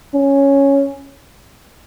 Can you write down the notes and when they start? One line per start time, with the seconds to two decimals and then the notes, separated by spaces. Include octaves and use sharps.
0.14 C#4